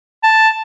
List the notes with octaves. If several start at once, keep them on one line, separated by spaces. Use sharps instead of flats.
A5